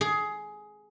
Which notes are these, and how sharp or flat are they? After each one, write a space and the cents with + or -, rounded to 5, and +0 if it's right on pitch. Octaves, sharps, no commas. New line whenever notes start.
G#4 +15